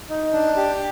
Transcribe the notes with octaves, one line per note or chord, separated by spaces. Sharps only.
D#4
D4
G4